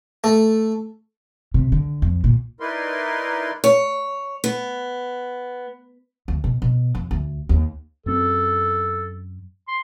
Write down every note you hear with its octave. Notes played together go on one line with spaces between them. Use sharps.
A3
C3
D3
F2
A#2
D#4 E4 A#4 B4 D5 C6
C#5
B3
D2
B2
B2
F2
D2
D#2
F#2 C4 A4
C6